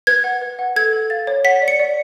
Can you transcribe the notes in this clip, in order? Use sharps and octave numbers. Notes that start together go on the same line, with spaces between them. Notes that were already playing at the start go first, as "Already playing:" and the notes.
B4 G#6
F#5
B4
F#5
A4 G#6
A4
F5 A6
C#5
F#5 B6
D5
C#7
D5